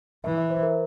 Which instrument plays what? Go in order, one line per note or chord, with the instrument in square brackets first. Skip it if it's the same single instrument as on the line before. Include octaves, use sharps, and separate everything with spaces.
[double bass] E3 [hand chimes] E5
[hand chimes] E5
C5
A#4